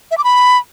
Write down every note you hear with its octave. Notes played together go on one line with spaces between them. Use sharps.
E5
D6
B5